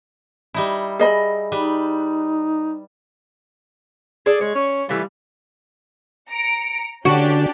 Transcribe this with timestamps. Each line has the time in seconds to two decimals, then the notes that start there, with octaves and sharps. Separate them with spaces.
0.54 G3 D#4 E4
0.99 G#4 D#5 B5
1.52 G3 D#4 B4
4.26 G#4 A4 D5
4.41 G#3 C#5
4.55 C#4
4.89 E3 G3 A3 F4
6.30 A#5 C#7 D7
7.05 D3 C#4 D4 F#4 G4